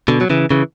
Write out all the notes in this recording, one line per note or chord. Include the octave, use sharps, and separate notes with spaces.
B2 D3
F#3
C#3 E3
C#3 E3